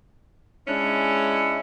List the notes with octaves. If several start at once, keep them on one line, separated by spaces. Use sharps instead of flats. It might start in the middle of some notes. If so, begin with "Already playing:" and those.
G#3 C#4 D4 E4